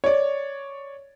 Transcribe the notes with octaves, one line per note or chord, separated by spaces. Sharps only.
C#5 D5